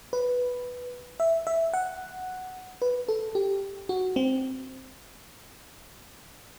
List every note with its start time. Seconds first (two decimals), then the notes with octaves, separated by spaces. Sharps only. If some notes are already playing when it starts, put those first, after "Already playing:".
0.13 B4
1.20 E5
1.47 E5
1.74 F#5
2.82 B4
3.08 A4
3.35 G4
3.89 F#4
4.16 C4